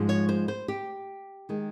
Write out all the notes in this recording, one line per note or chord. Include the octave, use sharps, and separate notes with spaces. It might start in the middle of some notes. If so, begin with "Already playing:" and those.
Already playing: G#2 F3 G#3
C#5
C5
C5
G4
D#3 G#3